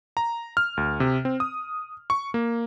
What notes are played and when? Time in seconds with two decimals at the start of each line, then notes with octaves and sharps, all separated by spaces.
0.17 A#5
0.57 F6
0.77 D2
1.00 C3
1.25 C4
1.40 D#6
2.10 C#6
2.34 A#3